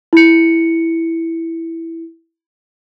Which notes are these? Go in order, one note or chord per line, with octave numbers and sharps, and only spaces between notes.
E4 C#7